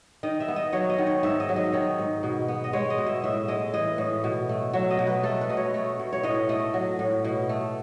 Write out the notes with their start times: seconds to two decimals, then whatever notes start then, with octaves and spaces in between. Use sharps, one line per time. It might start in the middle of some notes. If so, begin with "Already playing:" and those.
0.23 D#3 D#5
0.40 E5
0.48 B3
0.56 D#5
0.72 F#3 C#5
0.90 D#5
0.98 D#3
1.07 C#5
1.23 G#2 E5
1.40 D#5
1.49 F#3
1.56 D#5
1.73 D#3 C#5
1.98 G#2
2.23 B2
2.48 B3
2.64 D#5
2.73 G#3 C#5
2.90 D#5
2.98 B2
3.06 E5
3.24 A2 E5
3.48 G#3 D#5
3.74 E3 D#5
3.98 A2
4.24 B2
4.49 A3
4.73 F#3 E5
4.90 D#5
4.99 B2
5.07 B4
5.23 A3 A4
5.41 B4
5.49 B2 D#5
5.57 C#5
5.74 A3
5.99 B2
6.13 C#5
6.23 A2 D#5
6.49 A3 D#5
6.74 F#3
6.99 A2
7.25 B2
7.49 A3